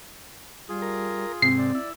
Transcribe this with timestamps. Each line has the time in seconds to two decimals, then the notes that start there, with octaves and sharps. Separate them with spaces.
0.69 G3 F4 G#4
0.82 A#4
1.42 G#2 C3 C4 C7
1.58 D5
1.75 E4